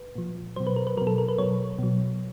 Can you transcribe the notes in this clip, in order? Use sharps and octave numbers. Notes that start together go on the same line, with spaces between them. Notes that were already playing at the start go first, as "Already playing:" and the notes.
Already playing: B4
A#2 F3
B2 F#3 C5
B4
A#4
B4
B2 F#3 A#4
A4
A#4
B4
B2 F#3 C#5
B2 F#3